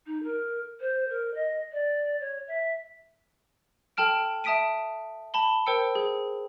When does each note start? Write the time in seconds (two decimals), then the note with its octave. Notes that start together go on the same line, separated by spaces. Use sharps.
0.06 D#4
0.23 A#4
0.80 C5
1.09 A#4
1.34 D#5
1.72 D5
2.20 C#5
2.47 E5
3.97 A4 G5 A5 F6 D7
4.44 E5 A5 D#6 B6 D7 D#7
5.34 A5 B5 G7
5.66 A#4 C5 G5 E6 C#7
5.95 G#4